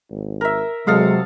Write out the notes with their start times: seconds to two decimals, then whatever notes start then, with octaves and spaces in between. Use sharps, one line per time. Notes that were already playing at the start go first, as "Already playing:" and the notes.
0.10 G#1
0.41 A#4 E5
0.87 C3 F#3 G#3 A4 F5 D#6